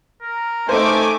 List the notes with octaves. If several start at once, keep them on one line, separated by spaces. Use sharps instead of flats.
A#4
A3 D#4 C5 G#5 D6